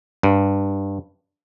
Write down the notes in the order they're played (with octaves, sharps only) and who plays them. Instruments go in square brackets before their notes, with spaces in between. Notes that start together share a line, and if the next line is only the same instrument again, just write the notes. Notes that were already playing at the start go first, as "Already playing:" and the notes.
[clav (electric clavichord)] G2